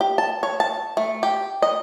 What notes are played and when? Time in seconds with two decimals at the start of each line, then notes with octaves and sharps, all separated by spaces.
0.01 G4
0.18 A5
0.43 C#5
0.60 A5
0.97 A3
1.23 G4
1.62 D#5